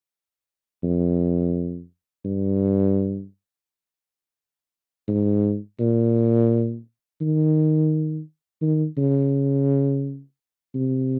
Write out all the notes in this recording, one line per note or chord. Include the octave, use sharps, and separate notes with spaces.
F2
G2
G#2
A#2
D#3
D#3
C#3
C3